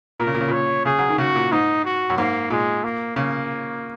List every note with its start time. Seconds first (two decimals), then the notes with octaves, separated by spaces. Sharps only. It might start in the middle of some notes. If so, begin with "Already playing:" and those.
0.20 A#2 A#4
0.27 C#3
0.34 A#2
0.41 C#3
0.48 A#2 C#5
0.85 C#3 G#4
0.99 F#3
1.09 D#3
1.18 C#3 F#4
1.35 A#2
1.52 G#2 D#4
1.85 F#4
2.10 F#2
2.17 G#2 A#3
2.50 A#2 G#3
2.84 A#3
3.16 C#3 A#3